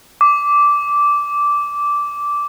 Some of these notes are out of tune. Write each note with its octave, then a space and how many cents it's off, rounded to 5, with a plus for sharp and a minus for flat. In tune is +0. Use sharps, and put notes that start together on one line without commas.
D6 -10